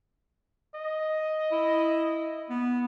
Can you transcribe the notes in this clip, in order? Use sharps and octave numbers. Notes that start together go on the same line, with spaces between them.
D#5
E4
B3